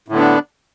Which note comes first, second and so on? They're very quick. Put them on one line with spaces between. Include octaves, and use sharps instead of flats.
A2 D3 B3 D4